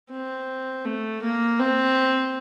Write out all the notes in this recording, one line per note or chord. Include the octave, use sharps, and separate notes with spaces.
C4
A3
A#3
C4